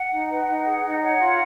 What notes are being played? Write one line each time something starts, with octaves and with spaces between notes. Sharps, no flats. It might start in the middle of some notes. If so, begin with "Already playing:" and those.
Already playing: F#5
D#4
B4 F#5
D#4
G#4
D#4
C#5 F#5
F4